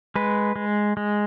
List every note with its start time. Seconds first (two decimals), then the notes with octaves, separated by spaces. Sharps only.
0.16 G#3 B4
0.56 G#3
0.97 G#3